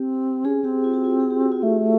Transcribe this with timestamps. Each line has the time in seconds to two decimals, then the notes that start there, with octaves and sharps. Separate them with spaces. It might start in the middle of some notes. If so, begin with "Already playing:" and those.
Already playing: C4 G4
0.45 C#4 G#4
0.64 C4 G4
0.84 F4
0.94 F#4
1.04 F4
1.20 G#4
1.30 G4
1.41 F#4
1.52 F4
1.62 A3 E4